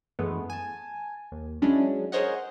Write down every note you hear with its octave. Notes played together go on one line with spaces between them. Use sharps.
F#2 E3 G#3 A3 B3
G#5 A5
D#2
F#3 G#3 C#4 D4 E4
G#4 A#4 C5 C#5 D#5 F#5